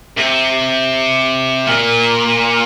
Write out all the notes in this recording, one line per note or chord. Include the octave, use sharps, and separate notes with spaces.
C3
A#2